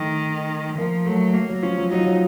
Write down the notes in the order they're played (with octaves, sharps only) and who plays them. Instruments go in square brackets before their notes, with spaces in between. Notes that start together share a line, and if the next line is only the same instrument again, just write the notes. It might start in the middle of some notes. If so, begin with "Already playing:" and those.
Already playing: [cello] D#3 [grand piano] A3
[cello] F3 [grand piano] A#3
[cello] F#3 [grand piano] A3
[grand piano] F#3 [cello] A#3
[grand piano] F#3
[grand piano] F3 [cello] C#4
[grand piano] F#3
[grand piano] F#3 [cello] D#4
[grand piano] F3
F#3